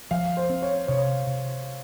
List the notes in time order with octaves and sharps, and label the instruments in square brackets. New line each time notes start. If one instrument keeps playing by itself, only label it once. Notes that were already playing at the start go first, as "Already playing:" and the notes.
[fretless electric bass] F3 [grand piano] F5
[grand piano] C5
[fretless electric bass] C4
[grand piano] C#5
[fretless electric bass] C3 [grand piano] C#5
[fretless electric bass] C3